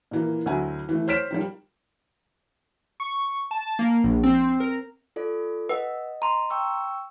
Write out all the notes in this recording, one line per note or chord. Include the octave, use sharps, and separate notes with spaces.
A#2 E3 A#3
D2 F#3 E4 G#5
E3 A3
C5 C#5 F6 B6 D7 E7
D#3 F3 G3
C#6
A5
A#3
A#1
C4
A#4
F4 A4 D5
B4 D#5 F#5
A#5 C6
G5 C#6 E6